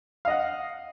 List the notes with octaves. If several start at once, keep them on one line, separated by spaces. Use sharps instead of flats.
D#5 F5 F#5